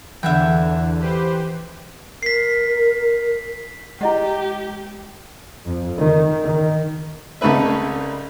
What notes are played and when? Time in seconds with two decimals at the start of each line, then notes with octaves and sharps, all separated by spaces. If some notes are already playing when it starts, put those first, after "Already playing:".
0.23 E2 D3 E3 E5 F#5 G5
1.00 G4 B4 C5
2.23 A#4 B6 C7
4.01 G#3 E4 G4 D#5 F#5
5.65 F2
5.99 D#3
6.43 D#3
7.41 C2 C#3 A3 D#4 B4 E5